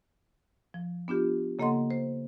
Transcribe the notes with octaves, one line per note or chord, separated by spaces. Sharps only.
F3
B3 D4 F4 G4
C#3 A#3 A4 D#5 F#5 C6
C5